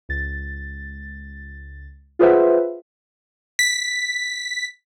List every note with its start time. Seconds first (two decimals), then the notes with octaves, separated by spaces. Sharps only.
0.09 C#2 A6
2.19 F4 G#4 B4 C5 E5 F#5
3.59 B6